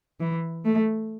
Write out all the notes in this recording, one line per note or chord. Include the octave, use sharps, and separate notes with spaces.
E3
A3